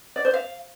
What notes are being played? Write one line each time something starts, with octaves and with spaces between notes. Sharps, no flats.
D5
C5
F5